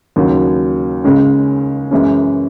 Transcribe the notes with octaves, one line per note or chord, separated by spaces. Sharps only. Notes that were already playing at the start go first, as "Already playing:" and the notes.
D#2 C#3 F#3
C#2 C#3 G#3 C#4
F#2 E3 G#3 C#4